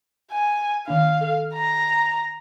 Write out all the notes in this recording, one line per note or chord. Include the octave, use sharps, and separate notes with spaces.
G#5
D#3 A#3 D4 F5
A4
A#5